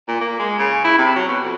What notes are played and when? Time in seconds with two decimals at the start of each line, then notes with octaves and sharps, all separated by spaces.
0.08 A#2
0.21 A#3
0.39 G#3
0.59 C#3
0.84 E4
0.98 C3
1.16 F#3
1.29 B2
1.44 F2